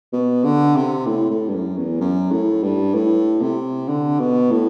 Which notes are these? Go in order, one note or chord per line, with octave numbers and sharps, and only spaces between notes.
B2
D3
C3
A2
A2
G2
F#2
E2
F#2
A2
G2
A2
C3
D3
B2
A2